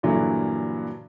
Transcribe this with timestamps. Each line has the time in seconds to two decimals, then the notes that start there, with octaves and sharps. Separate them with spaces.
0.03 G2 A#2 D3 E3 F#3